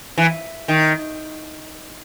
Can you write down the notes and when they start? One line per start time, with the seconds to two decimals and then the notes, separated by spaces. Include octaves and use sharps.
0.18 E3
0.68 D#3